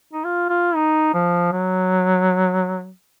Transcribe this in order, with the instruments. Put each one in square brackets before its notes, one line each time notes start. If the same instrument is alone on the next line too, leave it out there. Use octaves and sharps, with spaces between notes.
[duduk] D#4
F4
F4
D#4
F3
F#3